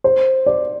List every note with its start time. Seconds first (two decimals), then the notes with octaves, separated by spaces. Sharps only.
0.04 C5
0.46 D5